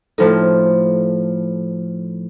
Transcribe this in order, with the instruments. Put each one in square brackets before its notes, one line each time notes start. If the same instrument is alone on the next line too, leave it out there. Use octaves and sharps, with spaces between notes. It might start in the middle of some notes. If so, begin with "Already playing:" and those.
[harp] A2 F3 D#4 [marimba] A4